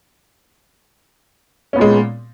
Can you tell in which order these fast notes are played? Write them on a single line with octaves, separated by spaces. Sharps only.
C#4 B3 A#2 G#3